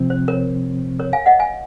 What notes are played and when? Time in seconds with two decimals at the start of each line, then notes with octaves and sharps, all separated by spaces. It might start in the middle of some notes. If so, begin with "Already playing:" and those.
Already playing: C3 F3 C4
0.10 C5
0.28 A#4 C#5
0.99 A#4 C#5
1.13 F5 G#5
1.26 D#5 F#5
1.39 F5 G#5